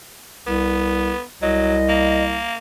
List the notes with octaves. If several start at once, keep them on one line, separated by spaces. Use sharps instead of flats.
C2 B3
C2 F#3 D#5
A#3